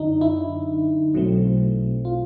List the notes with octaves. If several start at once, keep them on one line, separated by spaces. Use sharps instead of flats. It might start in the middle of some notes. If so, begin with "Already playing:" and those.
Already playing: F#2 D3 D4 D#4
E4
B1 B2 F#3 A3 C4
F4